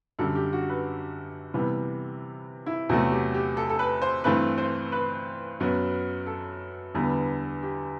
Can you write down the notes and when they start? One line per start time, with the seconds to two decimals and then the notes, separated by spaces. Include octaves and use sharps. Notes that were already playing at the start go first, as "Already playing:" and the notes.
0.19 F#2 D3 G3 A4
0.35 G4
0.53 F#4
0.69 B4
1.54 C3 E3 G3 B3
2.66 E4
2.89 E2 C3 F#3 A3 F#4
3.11 G4
3.34 G4
3.57 A4
3.70 A4
3.79 B4
4.02 C5
4.24 G2 E3 A3 C4 B4
4.58 C5
4.92 B4
5.60 F#2 F#3 B3
6.27 A4
6.94 E2 D3 G3 B3
7.63 G4